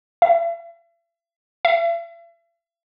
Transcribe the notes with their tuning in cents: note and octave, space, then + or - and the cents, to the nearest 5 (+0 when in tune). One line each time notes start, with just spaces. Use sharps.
E5 +45
E5 +45